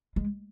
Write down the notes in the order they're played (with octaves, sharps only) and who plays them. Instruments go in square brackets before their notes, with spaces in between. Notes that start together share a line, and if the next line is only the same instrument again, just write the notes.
[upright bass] G#3